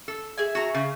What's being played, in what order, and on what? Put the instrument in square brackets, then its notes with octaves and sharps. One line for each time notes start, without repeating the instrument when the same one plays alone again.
[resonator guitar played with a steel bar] A4
[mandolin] G#4 E5 G#5
[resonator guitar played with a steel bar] F#4 A#5
C#3